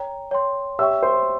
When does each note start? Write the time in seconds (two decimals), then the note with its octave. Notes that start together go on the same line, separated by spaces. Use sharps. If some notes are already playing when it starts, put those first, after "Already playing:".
Already playing: C#5 G5 A#5
0.31 C#5 G5 C6
0.79 G4 C#5 E5 G5 C#6 E6
1.02 C5 C6